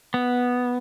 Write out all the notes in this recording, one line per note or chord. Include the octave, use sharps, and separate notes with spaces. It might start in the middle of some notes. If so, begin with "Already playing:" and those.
B3